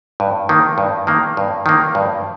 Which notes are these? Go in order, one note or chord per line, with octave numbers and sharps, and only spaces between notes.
G2
D#3 A#3
G2
D#3 A#3
G2
D#3 A#3
G2